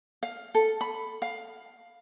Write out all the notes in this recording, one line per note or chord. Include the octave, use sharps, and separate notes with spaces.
F5
A4
B5
F5